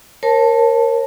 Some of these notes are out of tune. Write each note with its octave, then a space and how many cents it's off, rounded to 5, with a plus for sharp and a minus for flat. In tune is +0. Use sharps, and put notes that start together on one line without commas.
A#4 +0 C#5 -40 A5 +0